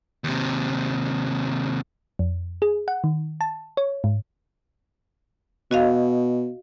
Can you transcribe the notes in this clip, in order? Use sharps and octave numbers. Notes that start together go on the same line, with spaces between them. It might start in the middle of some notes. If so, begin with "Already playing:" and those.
D#2 C3
F2
G#4
F#5
D#3
A5
C#5
G#2
B2 F#4 D#5 F5